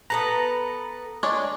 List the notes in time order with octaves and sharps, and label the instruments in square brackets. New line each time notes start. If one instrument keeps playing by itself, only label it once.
[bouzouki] B3 A4 B4 [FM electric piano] A#5
[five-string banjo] G#3 D4 C#5